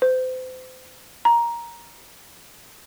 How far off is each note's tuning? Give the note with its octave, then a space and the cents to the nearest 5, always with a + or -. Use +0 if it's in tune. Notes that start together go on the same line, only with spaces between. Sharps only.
C5 -35
A#5 +10